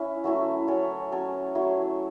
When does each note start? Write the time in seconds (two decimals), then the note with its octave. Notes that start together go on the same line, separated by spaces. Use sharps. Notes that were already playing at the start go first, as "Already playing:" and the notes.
Already playing: C#4 E4
0.24 F#3 A3 C#4 E4
0.67 F#3 C#4 A4 C#5
1.12 F#3 C#4 A4 C#5
1.55 F#3 A3 E4